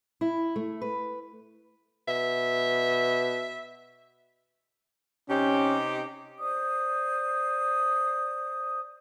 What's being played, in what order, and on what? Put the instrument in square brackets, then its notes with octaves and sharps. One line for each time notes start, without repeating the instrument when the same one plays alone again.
[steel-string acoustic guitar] E4
A3
B4
[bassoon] B2 [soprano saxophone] E5
[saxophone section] C3 D#4 G4 [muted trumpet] C#4
[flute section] C5 D5 D#6